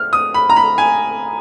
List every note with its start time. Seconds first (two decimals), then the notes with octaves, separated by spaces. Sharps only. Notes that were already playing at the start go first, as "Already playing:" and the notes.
Already playing: F6
0.13 D#6
0.34 B5
0.50 A#5
0.56 B5
0.78 G#5